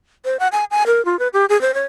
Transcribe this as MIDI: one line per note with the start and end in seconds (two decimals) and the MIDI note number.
0.25 0.37 72
0.40 0.48 78
0.52 0.65 80
0.71 0.83 80
0.87 1.04 70
1.05 1.18 65
1.19 1.28 71
1.34 1.46 67
1.49 1.59 68
1.61 1.74 72
1.74 1.85 73